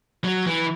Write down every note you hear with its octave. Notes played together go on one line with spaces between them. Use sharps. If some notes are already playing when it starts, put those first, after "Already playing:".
F#3
E3